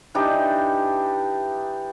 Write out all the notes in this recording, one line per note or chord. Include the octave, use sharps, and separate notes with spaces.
E3 D4 D#4 G4